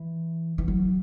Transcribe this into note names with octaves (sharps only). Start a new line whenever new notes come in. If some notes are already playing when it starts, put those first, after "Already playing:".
Already playing: E3
E3
F#3